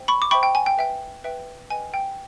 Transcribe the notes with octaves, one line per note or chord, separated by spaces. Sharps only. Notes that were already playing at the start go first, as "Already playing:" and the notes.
Already playing: C5 E5 G5
B5 C#6
D6
C5 E5 G5 B5 C#6
G5
G#5
G5
B4 E5 G5
B4 E5 G5
B4 D#5 G5 G#5
G5